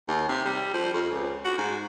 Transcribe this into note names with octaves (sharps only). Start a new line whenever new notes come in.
D#2
C3
G3
F3
F2
C#2
F#4
G#2